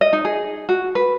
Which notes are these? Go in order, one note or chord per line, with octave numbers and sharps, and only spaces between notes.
D#5
D#4
G#4
F#4
B4